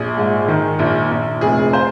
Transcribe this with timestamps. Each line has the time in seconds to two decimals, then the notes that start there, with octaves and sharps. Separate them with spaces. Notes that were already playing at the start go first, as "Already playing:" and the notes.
Already playing: A#1 G#4
0.17 G#2
0.48 D#3
0.79 A#1
1.11 A#1
1.41 F1 G#4
1.73 C5